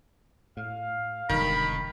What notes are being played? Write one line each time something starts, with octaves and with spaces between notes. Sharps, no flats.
A2 F5
E1 G2 D3 D#3 B5